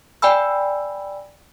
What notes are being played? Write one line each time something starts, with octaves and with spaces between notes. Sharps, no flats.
D5 G5 G#5 B5 E6